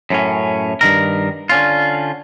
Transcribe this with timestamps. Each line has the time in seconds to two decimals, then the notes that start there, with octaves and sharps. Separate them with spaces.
0.10 F#2 A2 C#4
0.81 G2 D#3 A#4
1.49 D3 C#4 F4